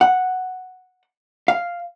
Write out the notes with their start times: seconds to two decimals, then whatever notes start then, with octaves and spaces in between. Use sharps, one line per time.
0.01 F#5
1.48 F5